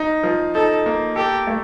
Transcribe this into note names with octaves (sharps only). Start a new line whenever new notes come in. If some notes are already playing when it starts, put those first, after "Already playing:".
Already playing: D#4
F3
D#4 A4
A#3
G4 A4
A3